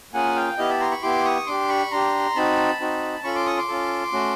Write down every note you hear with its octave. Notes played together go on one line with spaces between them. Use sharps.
A#3 C#4 F4 G#4 F#5 G#5
F5 G5
B3 E4 G4 D#5 F5
A5 B5
A#5 C6
B5 C#6
B3 E4 G4 C6 D6
C#6 D#6
D4 G4 C6 D6
B5 C#6
D4 G4 A#5 C6
C4 D#4 F#4 A5 B5
C4 D#4 F#4
C#4 F4 A4 B5 C#6
C6 D6
C#6 D#6
C6 D6
C#4 F4 A4
A3 C#4 F#4